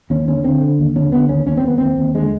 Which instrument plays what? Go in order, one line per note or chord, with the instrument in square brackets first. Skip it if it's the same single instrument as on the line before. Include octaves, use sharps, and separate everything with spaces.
[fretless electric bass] D#2 C#4
D3 C#4
D3 C4
D3
D#2
D3 C#4
D3 B3
D#2 C#4
D#2 C#4
C4
D#2 B3
D#2 C4
D#2
D3 G#3